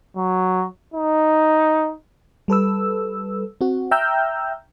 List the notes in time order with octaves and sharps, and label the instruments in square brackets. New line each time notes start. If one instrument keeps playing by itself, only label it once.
[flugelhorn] F#3
D#4
[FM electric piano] G3 A4 B4 E6
C4 F#4
E5 G5 A#5 E6 F6 G6